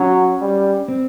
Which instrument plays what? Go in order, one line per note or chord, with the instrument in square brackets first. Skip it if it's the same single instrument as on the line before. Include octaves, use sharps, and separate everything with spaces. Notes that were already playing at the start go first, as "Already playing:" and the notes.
Already playing: [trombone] F#3 [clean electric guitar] C#4
[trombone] G3
[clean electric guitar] C4